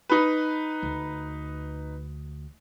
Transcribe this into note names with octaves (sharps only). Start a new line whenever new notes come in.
D#4 B4
D2